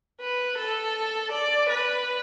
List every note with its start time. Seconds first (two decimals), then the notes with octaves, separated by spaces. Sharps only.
0.21 B4
0.58 A4
1.32 D5
1.69 B4